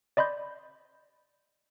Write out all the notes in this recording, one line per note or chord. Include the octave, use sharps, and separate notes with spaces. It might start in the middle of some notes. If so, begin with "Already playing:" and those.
D5 D#5 B5 C6 G6